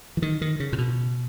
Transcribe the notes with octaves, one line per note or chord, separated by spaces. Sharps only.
E3
D#3
D#3
C#3
A#2
B2